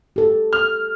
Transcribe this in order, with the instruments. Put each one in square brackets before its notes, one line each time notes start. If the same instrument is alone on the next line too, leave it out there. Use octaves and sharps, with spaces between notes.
[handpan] G4 A4
[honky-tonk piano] F6